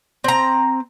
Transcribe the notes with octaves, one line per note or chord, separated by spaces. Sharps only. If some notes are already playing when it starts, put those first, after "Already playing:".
C4 A#5